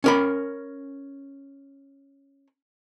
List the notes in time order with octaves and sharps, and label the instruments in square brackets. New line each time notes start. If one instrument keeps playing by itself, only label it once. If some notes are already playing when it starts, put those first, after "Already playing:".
[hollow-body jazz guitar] C#4 A#4 B5